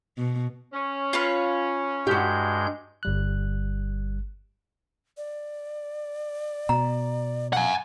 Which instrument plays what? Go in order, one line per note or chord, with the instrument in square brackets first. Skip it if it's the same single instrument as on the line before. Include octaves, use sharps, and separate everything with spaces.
[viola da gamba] B2
[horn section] C#4
[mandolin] F4 B4 C#5
[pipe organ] G2 G#3 G6 [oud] F#4 G4
[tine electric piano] G1 G3 F#6
[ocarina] D5
[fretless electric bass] B2 [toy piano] A#5
[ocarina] F5 [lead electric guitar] F#5 G#5